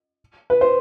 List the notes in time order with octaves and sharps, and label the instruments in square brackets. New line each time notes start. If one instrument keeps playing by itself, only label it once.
[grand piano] B4
C5